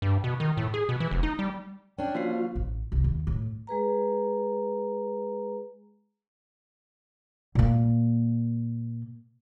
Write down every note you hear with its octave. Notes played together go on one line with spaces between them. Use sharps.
G2
B2
D#3
A2
G#4
B2
E3
F1
D#4
G3
C#4 D4 G5
F3 A#3 F4 F#4 C5 C7
A1
C2
D#2
A2
G#3 G#4 B4 A#5
A#2 A#3